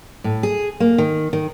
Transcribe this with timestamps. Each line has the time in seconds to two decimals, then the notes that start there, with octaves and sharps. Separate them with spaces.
0.24 A2
0.43 G#4
0.80 A#3
0.98 D#3
1.33 D#3